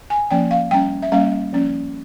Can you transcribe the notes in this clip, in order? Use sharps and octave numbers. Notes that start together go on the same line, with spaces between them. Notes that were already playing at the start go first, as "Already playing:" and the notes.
G#5
F3 A#3 C#4 G5
F5
G3 C#4 G5
E5
G3 A#3 C#4 F5
F3 A#3 C#4